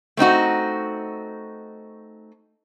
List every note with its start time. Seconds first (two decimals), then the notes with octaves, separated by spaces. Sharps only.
0.17 A3 C4 D#4 F#4